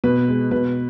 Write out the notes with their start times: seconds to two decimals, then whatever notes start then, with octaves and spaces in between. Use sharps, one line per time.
0.04 B2 B4
0.28 G#3
0.51 B2 B4